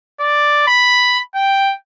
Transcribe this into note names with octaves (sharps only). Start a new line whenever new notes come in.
D5
B5
G5